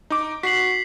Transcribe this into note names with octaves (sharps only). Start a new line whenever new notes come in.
D#4 D6
F#4 B6 C7 F#7